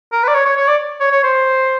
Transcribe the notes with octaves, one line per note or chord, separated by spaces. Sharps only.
A#4
B4
D5
C#5
C#5
C#5
D5
C#5
C#5
C5